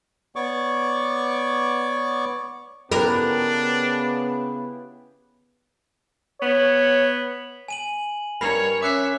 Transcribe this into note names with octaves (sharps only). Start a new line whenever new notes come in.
B3 C#5 D5 C#6 D6
C#3 B3 D4 E4 G4 A#4 B4
B3 C#5
G#5 D#7 F#7
G2 A#4 C#5 B5 C7 F7
C#4 E5 D6 F#6 C7